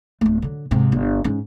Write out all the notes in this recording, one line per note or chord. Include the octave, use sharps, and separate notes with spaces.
D1 A3
D3 F#3
G#2 C3
G1
G#2 C#4